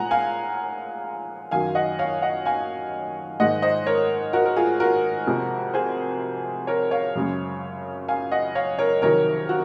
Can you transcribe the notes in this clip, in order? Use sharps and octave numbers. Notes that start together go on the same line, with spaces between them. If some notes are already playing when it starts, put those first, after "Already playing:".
Already playing: A#2 G#3 F#5 G#5 A#5
F5 G#5
F#2 D#3 F#3 F5 G#5
D#5 F#5
C#5 F5
D#5 F#5
F5 G#5
G#2 D#3 G#3 D#5 F#5
C5 D#5
A#4 C#5
F#4 A#4
A#4
F4 G#4
F#4 A#4
F2 C3 F3 G#3
G#4 C5
A#4 C#5
C#5 F5
F#2 C#3 G#3
F5 G#5
D#5 F#5
C#5 F5
A#4 C#5
F2 C3 D#3 F#3 A#4 C#5
F#4